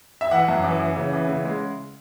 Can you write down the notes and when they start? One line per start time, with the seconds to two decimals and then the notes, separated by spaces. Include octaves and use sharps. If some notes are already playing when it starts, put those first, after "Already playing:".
0.21 E5
0.31 E3 F#5
0.48 F#2
0.64 E3
0.80 E3
0.96 C#3
1.13 E3
1.28 C#3
1.45 G#3